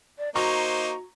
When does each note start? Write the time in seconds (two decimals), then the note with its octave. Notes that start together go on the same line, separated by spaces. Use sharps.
0.19 D5
0.35 A#3 D#4 F#4 C5 A#5 C#6